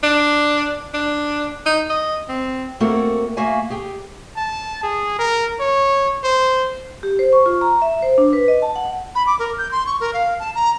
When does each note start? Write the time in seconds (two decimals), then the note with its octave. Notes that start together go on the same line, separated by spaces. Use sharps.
0.03 D4
0.94 D4
1.66 D#4
1.90 D#5
2.29 C4
2.80 A3 A#3 C4 F#4 A4 A#4
3.37 A3 A#3 F#4 E5 F5 G#5
3.70 G4 G#4 G5
4.36 A5
4.83 G#4
5.19 A#4
5.60 C#5
6.23 C5
7.03 G4
7.19 C5
7.33 C#6
7.46 F4
7.61 A#5
7.82 E5
8.02 C5
8.18 D4
8.33 B4
8.48 D#5
8.62 A5
8.76 F#5
9.15 B5
9.26 D6
9.39 A#4
9.58 G6
9.71 C6
9.86 C#6
10.00 A#4
10.13 F5
10.39 A5
10.54 A#5